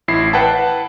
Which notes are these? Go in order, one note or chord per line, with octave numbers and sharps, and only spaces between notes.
A1 E4 C7
B4 F#5 G5 A5